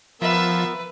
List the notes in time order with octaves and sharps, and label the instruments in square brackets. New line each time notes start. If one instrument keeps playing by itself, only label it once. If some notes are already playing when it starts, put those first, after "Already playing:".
[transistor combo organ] F3 [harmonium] B3 A#4 [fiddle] B4 [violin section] E5